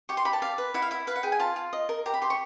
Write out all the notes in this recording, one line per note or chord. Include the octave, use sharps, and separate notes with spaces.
G4 C#6
C6
G4 B5
A5
D5 F5
B4
E4 F#5
F5
E4 E5
B4 F5
F#5
G#4 G5
G#5
F4 A5
F4
D#5
A#4
G4 A#5
B5
G4 C6
C#6